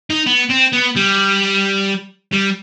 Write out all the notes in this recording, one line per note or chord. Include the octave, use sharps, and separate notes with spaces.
D#4
B3
C4
B3
G3
G3